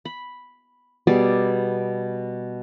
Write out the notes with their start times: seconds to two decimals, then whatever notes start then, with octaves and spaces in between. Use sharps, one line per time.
0.05 B5
1.07 B2 G3 G#4 D5